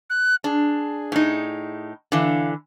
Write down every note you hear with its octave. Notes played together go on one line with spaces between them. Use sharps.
F#6
D4 G#4
A2 D#4
D3 E3 F5